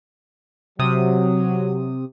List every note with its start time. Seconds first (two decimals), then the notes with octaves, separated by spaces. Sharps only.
0.79 C3 F#3 D#6